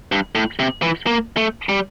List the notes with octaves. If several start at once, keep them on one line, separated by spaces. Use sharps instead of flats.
G2
A2
C3
E3
A#3
A3
G3